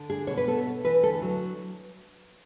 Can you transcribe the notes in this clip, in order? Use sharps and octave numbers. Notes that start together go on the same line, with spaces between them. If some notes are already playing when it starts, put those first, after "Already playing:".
Already playing: D3
D4 G#4
B2 C#5
B4
B3 A4
B2
E3 B4
D2 A4
F#3